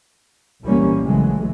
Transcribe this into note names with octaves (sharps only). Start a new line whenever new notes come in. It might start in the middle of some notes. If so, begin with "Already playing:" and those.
C2 A#2 E3 G3 A#3 C#4
A#1 C#3 E3 F#3 G#3 A3